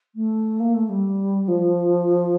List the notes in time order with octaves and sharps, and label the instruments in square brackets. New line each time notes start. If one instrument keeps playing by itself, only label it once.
[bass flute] A3
A#3
A3
G3
F3